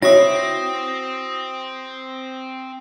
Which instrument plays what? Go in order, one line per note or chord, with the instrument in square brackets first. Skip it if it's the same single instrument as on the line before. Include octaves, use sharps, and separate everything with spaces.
[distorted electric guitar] C4 [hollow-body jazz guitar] E4 F#4 E5 [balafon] C#5 [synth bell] D#6 A#6